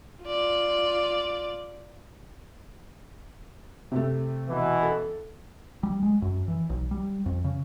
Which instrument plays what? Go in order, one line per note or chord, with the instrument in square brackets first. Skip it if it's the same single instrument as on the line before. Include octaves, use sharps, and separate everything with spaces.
[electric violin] F4 D5
[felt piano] C3 A3
[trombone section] B2 E3
[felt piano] A4
[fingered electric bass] G3
G#3
F#2
E3
B1
G3
F2
C#3